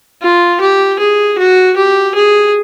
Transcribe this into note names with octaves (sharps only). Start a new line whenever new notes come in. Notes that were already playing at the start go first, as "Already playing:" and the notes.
F4
G4
G#4
F#4
G4
G#4